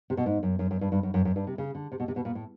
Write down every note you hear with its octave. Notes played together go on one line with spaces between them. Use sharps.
C3
B2
G#2
F#2
F#2
F#2
G2
G2
F#2
F#2
F#2
G2
C3
C#3
D3
C3
B2
C3
B2
A#2
A2